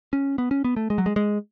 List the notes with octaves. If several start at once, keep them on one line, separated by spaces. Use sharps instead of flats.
C#4
B3
C#4
B3
A3
G#3
F#3
G#3
G#3